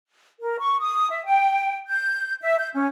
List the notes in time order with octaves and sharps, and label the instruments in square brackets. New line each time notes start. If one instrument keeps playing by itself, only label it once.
[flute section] A#4
C#6
D#6
E5
G5
G6
E5
G6
C#4